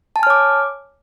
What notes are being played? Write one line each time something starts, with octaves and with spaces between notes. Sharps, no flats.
C#5 G#5 A5 D6 F6